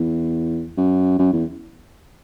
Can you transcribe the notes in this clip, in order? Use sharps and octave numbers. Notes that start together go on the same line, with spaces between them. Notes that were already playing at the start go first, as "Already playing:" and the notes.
Already playing: E2
F#2
F#2
E2